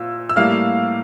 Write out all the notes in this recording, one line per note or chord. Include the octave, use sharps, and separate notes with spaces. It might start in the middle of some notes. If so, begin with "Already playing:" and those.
Already playing: A#2 E6
E6
A2 G3 A#3 F5 F6